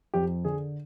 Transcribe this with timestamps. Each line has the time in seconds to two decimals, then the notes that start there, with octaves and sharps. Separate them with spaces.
0.14 F2 G4
0.45 D3 G#4